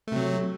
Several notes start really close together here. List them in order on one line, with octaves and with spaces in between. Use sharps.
A3 C3 F#3